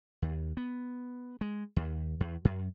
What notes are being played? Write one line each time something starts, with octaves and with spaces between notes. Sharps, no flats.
D#2
B3
G#3
D#2
E2
F#2